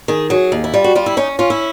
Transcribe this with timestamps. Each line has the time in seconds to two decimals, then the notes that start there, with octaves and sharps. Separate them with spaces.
0.08 D#3 G#4
0.30 F#3 G#4
0.52 D#2
0.64 E4
0.74 G3 F4
0.84 F#4
0.95 G3 F4
1.06 E4
1.17 C#4 D#4
1.39 C#4 F4
1.50 E4